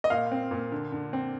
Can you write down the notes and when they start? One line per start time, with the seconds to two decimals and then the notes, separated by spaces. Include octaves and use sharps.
0.04 D#5
0.10 A#2 F5
0.31 C4
0.51 A#2
0.72 D3
0.92 D3
1.13 C4